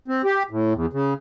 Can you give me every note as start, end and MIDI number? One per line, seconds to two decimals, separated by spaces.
0.08 0.22 60
0.24 0.43 67
0.51 0.73 45
0.73 0.86 40
0.93 1.14 49